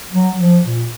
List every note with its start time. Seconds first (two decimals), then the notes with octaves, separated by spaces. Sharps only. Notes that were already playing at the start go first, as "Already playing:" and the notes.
0.12 F#3
0.39 F3
0.64 A#2